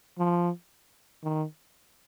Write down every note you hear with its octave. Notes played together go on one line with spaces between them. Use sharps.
F3
D#3